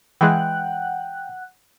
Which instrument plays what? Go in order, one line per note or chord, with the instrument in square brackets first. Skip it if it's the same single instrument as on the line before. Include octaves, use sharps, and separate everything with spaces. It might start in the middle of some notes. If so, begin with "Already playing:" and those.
[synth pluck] E3 G#3 [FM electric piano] F#5 F#6 [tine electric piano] G5